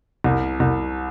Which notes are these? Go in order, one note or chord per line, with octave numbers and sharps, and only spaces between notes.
C2
C2